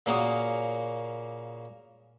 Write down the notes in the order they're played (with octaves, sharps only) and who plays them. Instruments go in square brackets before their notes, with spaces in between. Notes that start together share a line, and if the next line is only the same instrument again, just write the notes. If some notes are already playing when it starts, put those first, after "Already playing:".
[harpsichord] A#2 C#3 A#3 C#4 F#4 D#6